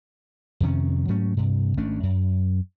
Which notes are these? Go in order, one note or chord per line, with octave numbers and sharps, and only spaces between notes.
F2 C3 D#3 C#4
G#2 F#3 A3 C#4
G2 C3
G#1 A3 C#4 D4
F#2